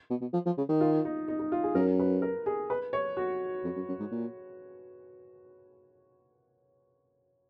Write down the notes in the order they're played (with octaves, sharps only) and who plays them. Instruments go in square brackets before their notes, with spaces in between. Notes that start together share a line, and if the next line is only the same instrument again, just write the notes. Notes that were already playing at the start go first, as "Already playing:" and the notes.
[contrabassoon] B2
B2
F3
F3
C#3
D#3
[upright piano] F4
D#4
D#4
D#4
F4
G#4
[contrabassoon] F#2 [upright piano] A#4
[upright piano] B4
A#4
G#4
B4
C#5
F#4
[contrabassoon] F2
F#2
F#2
G#2
A#2